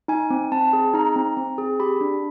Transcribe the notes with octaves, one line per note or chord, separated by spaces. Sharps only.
D#4 G#5
C4
C4 A5
G#4
D#4 A#5
C4
C4
G#4
G4 B5
D4